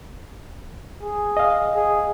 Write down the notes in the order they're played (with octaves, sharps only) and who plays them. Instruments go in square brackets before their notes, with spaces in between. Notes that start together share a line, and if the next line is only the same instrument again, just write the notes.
[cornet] G#4
[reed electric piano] D#5 F5
[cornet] G#4